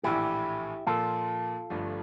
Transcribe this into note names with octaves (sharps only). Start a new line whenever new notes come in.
A#1 A2 E3 E4 G4
A#2 F3 A#3 F4 A4
G1 G2 F3 A3